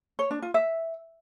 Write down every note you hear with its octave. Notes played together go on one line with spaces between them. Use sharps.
C#5
D4
F4
E5